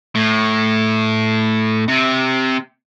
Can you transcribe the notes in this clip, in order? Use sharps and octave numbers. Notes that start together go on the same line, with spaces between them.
A2
C3